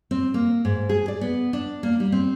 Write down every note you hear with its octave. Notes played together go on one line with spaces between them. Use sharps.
C4
A#3
G#2
G#4
D5
B3
D4
A#3
G3
C4